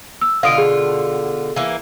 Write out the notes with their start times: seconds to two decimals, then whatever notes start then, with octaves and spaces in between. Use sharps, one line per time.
0.21 E6
0.43 B2 D3 F4 F5 D#6 D7
0.58 G#4
1.56 E3 A#3